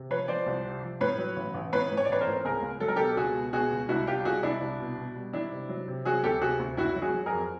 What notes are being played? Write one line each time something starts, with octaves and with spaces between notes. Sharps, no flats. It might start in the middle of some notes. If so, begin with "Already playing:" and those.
Already playing: C3
F3 B4 C#5
F3 C5 D5
C2
C3
F3
A2 B4 C#5
F#3
A1
A1
A2 B4 C#5
A2
C#5
D5
A1 B4 C#5
A#4 C5
A2
C#2 G#4 A#4
C#2
F#3 A4
A#4
B2 G4 A4
C#2 F#4 G#4
B2
B2 F#4 G#4
C#2
C2 E4 F#4
G3 F4 G4
C2 F#4 G#4
C2 D4 E4
C2
B2
B2
G3
D#3 D4 E4
C3
F#3
C3
F#3 F#4 G#4
D2 G4 A4
C3 F#4 G#4
D2
F#1 E4 F#4
F#3
F#4 G#4
F#3
G#4 A#4
F2